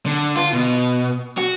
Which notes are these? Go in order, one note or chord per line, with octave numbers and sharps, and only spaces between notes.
D3
F4
B2
F#4